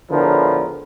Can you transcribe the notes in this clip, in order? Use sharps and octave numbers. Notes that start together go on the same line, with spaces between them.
E2 A2 D3 F3 A#4 B4